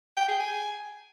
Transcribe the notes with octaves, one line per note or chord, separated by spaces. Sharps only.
G5
G#4
G#5